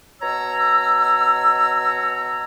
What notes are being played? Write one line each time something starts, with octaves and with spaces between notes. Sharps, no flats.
B2 C#5 A#5 E6